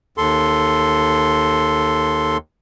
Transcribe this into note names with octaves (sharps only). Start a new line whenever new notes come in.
D#2 A4 C6